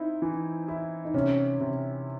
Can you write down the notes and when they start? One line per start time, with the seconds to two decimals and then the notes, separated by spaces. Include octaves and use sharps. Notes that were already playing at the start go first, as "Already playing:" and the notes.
Already playing: C4 D#4 E4
0.22 E3
0.68 E4
1.05 D#4
1.14 C3 C#4
1.60 C3